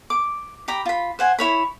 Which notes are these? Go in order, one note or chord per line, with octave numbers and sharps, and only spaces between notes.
D6
G4 A#5 B5 D6
F4 B5
C5 F#5 G#5
E4 C#5 B5